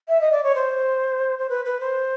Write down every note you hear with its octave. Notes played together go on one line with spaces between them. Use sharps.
E5
D#5
D5
C#5
C5
C5
B4
B4
C5